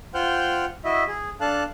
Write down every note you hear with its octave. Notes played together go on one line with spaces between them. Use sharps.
F4 C5 F#5 G5 F6 G6
E4 F#4 D#5 E5
G#4
D4 A4 F5 A5 F#6